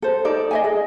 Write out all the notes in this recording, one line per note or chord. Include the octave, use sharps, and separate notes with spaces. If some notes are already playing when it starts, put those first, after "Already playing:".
A4 C5
D#4 A4 D5
D#5 E5 G#5
G#4